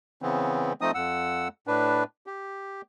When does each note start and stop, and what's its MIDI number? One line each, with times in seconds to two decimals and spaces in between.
0.22 0.73 49
0.22 0.73 52
0.22 0.73 59
0.22 0.73 60
0.81 0.91 53
0.81 0.91 57
0.81 0.91 60
0.81 0.91 63
0.81 0.91 75
0.81 0.91 87
0.95 1.48 41
0.95 1.48 78
0.95 1.48 88
1.67 2.04 45
1.67 2.04 62
1.67 2.04 71
2.27 2.82 67